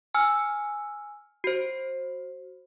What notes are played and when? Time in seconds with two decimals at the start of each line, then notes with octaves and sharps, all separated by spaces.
0.15 G#5 E6 F6
1.44 F#4 C5